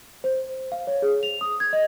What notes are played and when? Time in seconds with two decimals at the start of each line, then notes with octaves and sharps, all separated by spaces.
0.24 C5
0.72 F5
0.87 C#5
1.02 G#4
1.23 F7
1.41 D#6
1.60 G#6
1.73 D#5